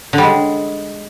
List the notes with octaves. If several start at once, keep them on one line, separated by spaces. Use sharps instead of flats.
D3
G3
G#3